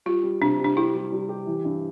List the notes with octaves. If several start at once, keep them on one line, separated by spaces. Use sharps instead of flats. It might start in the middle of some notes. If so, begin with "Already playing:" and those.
G3 F4
G3
C3 D4
G3
D4
E4 G4
G3
G3
G4
E3
G2